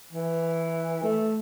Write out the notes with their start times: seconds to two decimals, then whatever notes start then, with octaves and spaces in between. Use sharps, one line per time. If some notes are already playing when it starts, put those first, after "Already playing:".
0.13 E3
1.03 A3